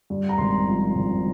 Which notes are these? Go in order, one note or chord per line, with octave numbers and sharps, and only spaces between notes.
G2
A#5
G#1 C6
F3
G#1